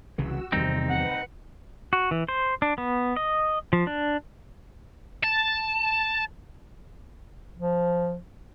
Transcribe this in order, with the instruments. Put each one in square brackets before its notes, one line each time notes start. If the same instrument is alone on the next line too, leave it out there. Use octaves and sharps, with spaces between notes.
[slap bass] C2 C#3 E3 [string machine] F#4 E6
[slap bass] E2 D#3 G3 [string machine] C3 [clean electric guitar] C4 D#4
[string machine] B4 [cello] F#5
[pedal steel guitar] F#4
E3
C5
D4
B3
D#5
F3
D4
[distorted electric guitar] A5
[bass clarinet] F3